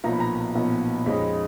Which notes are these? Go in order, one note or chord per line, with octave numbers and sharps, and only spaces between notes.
B1 A#2 F3 B3 A#5
B5
A#5
B1 A#2 F3 B3
F2 C#3 G#3 D#4 B5